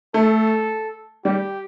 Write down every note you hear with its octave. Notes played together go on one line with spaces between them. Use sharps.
A3 A4
G3 G4